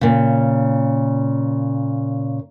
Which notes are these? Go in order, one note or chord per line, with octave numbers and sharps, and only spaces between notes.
A#2 C#3